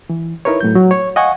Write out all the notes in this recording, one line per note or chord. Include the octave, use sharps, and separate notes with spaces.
E3
D#4 E4 A#4 B4 C#5
A2 F#3 G6
F#3
C#5
D#5 F5 F#5 G#5 C#6